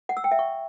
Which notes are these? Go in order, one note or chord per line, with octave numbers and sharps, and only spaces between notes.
F#5
E6
G5
E5
C#6